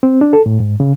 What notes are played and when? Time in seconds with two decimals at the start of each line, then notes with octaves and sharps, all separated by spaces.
0.03 C4
0.21 D4
0.33 A4
0.46 A2
0.60 G#2
0.80 C#3